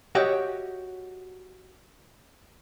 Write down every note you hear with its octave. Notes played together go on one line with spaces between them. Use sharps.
F#4 G4 C#5 D#5 E5 F#5